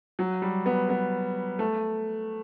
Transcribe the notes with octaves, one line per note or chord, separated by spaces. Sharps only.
F#3
G3
B3
B3
A3